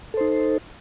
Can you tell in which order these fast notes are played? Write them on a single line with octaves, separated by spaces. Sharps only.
A4 C5 D#4